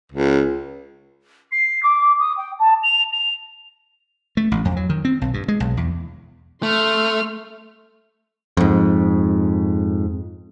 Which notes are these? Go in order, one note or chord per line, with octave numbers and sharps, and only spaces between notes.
C#2
C7
D6
D#6
G5
A5
F7
F7
A3
A1
F2
F#3
D#3
C4
B1
G2
G#3
B1
E2
A3 C6 F6
F2 G#2